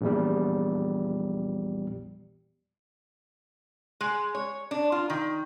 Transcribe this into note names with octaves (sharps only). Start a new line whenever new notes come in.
A#1 E2 G3
G#3
C#5
D4
F4
D#3